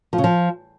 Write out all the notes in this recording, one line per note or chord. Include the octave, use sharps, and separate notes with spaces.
F3
C#3
F3